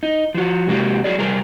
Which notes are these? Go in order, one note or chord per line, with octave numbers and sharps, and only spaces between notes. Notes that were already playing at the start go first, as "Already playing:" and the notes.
D#4
F3 F#4
C3 G#3 A#3 F#4 G4
F#3 G#4 D5
C3 G3 G#4 A#4